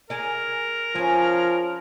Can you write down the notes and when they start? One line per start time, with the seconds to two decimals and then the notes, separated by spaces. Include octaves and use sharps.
0.10 G#4 A#4 D5
0.95 F3 C#4 G#4